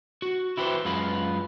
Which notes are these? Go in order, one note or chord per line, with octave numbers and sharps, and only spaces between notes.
F#4
E4 F#4 G4 B4 C5
F#2 G#3 F4 B4